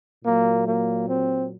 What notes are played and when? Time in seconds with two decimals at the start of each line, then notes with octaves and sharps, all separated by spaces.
0.23 A#2 F#3 A#3
0.65 A#3
1.08 C4